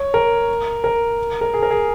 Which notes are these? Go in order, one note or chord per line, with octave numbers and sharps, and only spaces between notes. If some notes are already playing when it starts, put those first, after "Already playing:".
Already playing: C#5
A#4
A#4
A#4
G#4
A#4
G#4